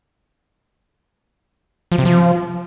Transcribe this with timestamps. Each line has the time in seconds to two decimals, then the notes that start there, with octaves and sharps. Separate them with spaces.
1.92 F3
1.98 C3
2.05 F3